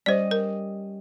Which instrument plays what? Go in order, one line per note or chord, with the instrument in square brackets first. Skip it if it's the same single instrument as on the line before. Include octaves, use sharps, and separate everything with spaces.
[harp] G3 C#4 D#5 [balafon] C5 D5
[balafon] A#4